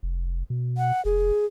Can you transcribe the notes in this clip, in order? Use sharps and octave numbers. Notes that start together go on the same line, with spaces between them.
F1
B2
F#5
F1 G#4